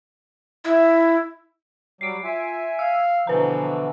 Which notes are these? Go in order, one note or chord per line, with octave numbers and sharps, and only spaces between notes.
E4
F#3 G3 C7 D7
F4 E5 G#5
F5 E6
B2 D3 E3 F3 B4 A#5